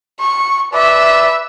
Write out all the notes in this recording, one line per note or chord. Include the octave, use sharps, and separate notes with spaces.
C#6
B4 D5 E5